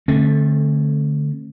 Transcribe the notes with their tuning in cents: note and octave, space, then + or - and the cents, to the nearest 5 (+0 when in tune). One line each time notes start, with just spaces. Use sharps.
D3 +0 A3 -10 C4 +45